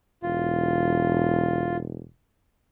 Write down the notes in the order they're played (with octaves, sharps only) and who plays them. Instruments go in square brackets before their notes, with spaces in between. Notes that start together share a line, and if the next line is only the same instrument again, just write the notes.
[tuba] E1 [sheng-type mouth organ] F4